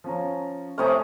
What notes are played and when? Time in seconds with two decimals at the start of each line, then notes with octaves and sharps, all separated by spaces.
0.04 F3 C#4 A#5
0.78 C3 A3 C#5 G#5 A#5 D#6 F6